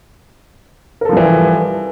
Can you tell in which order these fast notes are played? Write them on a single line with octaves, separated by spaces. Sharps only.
A#4 A4 F3 G3 E3